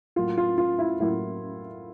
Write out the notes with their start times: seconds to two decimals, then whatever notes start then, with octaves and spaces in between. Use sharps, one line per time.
0.16 A2 F#3 A#3 F4
0.37 F4
0.58 F4
0.79 E4
1.00 A2 F#3 A#3 E4